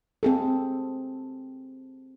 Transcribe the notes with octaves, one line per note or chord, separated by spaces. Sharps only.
C4 G#4 A4